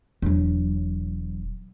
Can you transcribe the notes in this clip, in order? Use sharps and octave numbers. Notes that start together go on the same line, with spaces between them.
E1 F#3